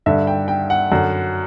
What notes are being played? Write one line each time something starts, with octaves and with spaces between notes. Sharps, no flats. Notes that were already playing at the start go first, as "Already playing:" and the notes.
G2 D3 E5
G5
G5
F#5
F#2 D3